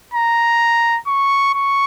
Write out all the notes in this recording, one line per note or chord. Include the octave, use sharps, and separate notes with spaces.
A#5
C#6
C#6